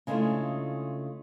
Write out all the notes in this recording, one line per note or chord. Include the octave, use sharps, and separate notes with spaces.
C#3 G#3 A3 D4 E4 F4